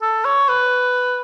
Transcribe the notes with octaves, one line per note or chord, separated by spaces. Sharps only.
A4
C#5
B4